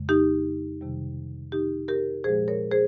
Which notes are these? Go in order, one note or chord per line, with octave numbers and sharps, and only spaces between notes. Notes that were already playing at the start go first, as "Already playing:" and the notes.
Already playing: F2 C#3 G#3
D#4 G4
F2 C3 D#3 G3
D#4 G4
G4 A#4
A#2 F3 G#3 G#4 C5
A#4 C#5
G#4 C5